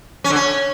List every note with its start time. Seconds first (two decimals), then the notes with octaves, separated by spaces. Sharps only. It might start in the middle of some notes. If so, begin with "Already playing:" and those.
0.24 C#4
0.30 D3
0.36 C#4